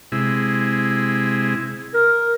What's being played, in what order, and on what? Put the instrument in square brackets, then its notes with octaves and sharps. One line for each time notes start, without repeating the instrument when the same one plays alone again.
[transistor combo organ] C3 G#3 E4
[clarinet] A#4